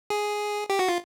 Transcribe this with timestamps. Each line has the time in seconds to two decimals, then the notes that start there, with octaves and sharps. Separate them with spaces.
0.10 G#4
0.70 G4
0.79 F#4
0.89 F4